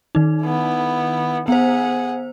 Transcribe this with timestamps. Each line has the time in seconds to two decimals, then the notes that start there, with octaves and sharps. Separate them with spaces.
0.15 D#3 D#4
0.44 B3 E4
1.48 B3 G#4 C5 F#5